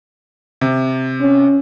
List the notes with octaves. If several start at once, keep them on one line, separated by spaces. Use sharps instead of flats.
C3
C#4